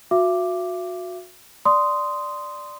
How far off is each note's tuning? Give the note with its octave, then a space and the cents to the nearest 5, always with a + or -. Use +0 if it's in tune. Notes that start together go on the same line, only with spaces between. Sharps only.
F#4 -30 E5 +40 D6 +0
D5 +0 C6 -10 D#6 +0